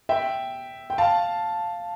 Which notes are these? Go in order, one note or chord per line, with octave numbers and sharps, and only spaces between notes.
E5 G5
G5
F5 A5